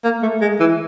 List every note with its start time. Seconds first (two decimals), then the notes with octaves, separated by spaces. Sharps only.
0.04 A#3
0.22 A3
0.41 G#3
0.60 E3